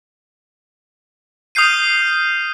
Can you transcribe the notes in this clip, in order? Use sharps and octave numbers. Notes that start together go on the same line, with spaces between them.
D#6 F6 G6 C7 D#7